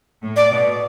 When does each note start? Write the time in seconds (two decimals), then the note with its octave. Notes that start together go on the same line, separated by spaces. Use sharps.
0.22 A2
0.36 D5
0.52 B2